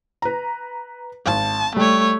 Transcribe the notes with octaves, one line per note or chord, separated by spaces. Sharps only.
B4 A#5
G#1 A5
G3 A3 C#5